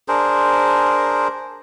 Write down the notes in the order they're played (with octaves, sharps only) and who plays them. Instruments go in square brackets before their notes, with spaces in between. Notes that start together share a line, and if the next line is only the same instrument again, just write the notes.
[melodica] D4 G#4 A#4 C5